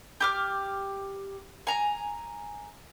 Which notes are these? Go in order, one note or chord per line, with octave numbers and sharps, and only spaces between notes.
G4 D6 F6
G#5 A#5